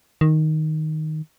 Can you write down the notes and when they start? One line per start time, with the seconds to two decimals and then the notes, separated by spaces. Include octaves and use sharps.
0.21 D#3